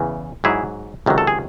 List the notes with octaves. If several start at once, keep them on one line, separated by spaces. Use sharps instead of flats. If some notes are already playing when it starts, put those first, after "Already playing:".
Already playing: E2 C#3 E3
G#2 F#3 E4 G#4
C#2 C3 D#3 F#3
A4
G#4